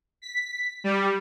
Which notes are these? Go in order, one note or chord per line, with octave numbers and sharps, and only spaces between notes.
B6
G3